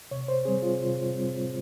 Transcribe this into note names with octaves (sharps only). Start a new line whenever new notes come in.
C3 C#5
C5
G3 C4 G#4
F4
C3
G3 C4